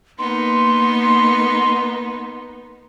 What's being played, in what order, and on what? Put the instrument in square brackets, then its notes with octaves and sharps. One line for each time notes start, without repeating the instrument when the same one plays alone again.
[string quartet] A#3 B3 D#4 [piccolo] C6